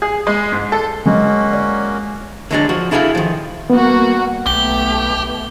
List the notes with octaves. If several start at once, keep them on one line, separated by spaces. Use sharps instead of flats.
G#4
G#3
G#2
A4
D3 F#3 G#3 A#3 C#4 F#4
D5
D3 F#3 G#3 C4 D4
F3 F#4
D4 E4 G#4 A4 E5 F5
D#3 F3
G3 A#3 B3 F#4
B1 A3 B3 G4 G7